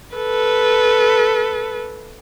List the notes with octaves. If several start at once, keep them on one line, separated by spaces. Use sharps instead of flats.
A4 B4